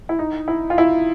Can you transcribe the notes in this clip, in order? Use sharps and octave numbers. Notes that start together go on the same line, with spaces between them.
E4
D#4
E4
F4
E4